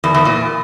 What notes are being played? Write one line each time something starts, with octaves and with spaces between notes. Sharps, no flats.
E2
E2
A#2